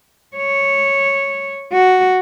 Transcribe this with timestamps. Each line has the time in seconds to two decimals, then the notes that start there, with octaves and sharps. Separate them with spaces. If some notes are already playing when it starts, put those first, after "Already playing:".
0.36 C#5
1.73 F#4